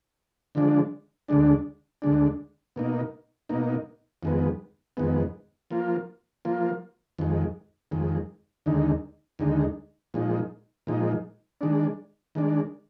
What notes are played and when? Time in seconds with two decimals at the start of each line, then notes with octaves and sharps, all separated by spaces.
0.55 D3 F3 G#3 D4
1.28 D2 D3 G#3 D4
2.02 D2 D3 G#3 D4
2.76 B2 A#3 D#4
3.49 B2 A#3 D#4
4.23 F2 D#3 G#3 B3
4.97 F2 D#3 G#3 B3
5.71 F3 A#3 F4
6.45 F3 A#3 F4
7.19 F2 D#3 G#3
7.91 F2 D#3 G#3
8.66 D#2 D3 G#3 D#4
9.39 D#2 D3 G#3 D#4
10.14 A#2 F3 G#3 D#4
10.87 A#2 F3 G#3 D#4
11.61 D#3 G#3 D4
12.35 D#3 G#3 D4